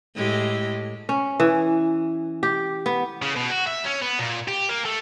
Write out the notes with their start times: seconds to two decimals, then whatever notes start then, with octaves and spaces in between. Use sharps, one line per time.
0.15 A2 G#3 G4
1.09 C#4
1.40 E3
2.43 G4
2.86 B3
3.22 C#3
3.36 B2
3.51 F#4
3.68 E5
3.85 C#4
4.02 B3
4.19 A#2
4.48 G4
4.69 A#3
4.85 A3